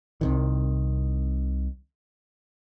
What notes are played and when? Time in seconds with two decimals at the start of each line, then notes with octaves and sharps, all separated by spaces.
0.21 C2 C3 D#3